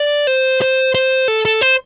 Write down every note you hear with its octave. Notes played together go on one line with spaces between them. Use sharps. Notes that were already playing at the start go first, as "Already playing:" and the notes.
Already playing: D5
C5
C5
C5
A4
A4
C5